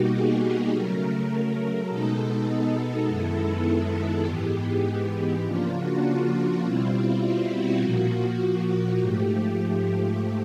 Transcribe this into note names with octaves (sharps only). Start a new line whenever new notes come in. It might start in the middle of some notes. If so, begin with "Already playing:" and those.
Already playing: B2 G3 A#3 D#4 F#4 G4
G#4
G#4
C#3 F#3 A3 A#4
B2 G#3 B3 D#4 A4
F#2 D#3 G#3 B3 E4
G#2 E3 G#3 B3 G4
C#3 F3 A#3 D4 F4
F#4
F4
B2 G3 C4 E4 F4
F4
E4
F#4
A#2 F3 A#3 F#4
G#2 F3 A3 G4